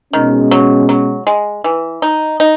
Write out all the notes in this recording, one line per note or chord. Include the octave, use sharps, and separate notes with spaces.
B2 D#3 G#3 C#4
F#3
F#3
G#3
E3
D#4
D#4